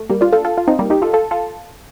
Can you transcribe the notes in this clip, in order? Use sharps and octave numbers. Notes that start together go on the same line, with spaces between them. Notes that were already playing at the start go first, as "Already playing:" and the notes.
Already playing: A3
G3 A#3
D4 F4
F4 A4
F4 A4
F4
C4 D#4
G3 A#3
D#4 G4
F4 A4
F4 A4
F4 A4